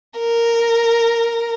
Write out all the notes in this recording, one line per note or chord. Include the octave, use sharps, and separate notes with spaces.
A#4